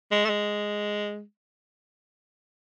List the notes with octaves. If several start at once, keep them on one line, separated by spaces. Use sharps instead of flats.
G#3
A3
G#3